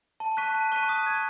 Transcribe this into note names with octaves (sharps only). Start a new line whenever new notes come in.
A5
C#6 F#6 B6 D#7
A5
C#6 F#6 B6 D#7
D#6
G#6 D#7